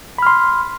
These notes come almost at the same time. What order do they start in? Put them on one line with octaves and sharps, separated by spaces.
B5 F6 C6